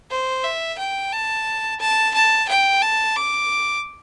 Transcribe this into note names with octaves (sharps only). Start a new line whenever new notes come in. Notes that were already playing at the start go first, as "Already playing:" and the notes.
C5
E5
G5
A5
A5
A5
G5
A5
D6